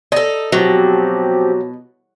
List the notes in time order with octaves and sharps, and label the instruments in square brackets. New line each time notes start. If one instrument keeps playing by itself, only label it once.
[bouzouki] D#4 A4 [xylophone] D5
[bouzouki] B2 [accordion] F3 C4 G4 [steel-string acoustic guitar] F#3